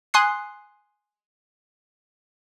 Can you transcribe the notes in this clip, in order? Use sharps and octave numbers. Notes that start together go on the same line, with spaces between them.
G#5 C6 D#6 F#6 C7